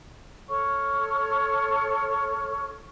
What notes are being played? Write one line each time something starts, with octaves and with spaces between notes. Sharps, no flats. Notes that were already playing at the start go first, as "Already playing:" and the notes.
A4 C#5 C#6 F6